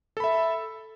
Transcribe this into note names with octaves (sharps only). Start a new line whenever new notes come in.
A4 E5 B5